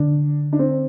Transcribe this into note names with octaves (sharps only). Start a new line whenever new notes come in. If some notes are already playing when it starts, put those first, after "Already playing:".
Already playing: D3 D4
D4
C4